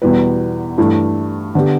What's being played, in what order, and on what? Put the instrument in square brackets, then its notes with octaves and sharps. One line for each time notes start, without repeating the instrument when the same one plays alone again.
[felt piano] E2 B2 G3 E4 B4
G2 E3 A3
D3 B3 G4